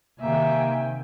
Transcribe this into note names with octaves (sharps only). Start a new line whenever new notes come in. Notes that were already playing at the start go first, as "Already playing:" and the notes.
C3 D#3 A#3 E5 G5 G#5